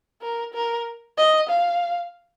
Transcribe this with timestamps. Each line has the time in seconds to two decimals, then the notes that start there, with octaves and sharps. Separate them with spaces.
0.22 A#4
0.54 A#4
1.18 D#5
1.49 F5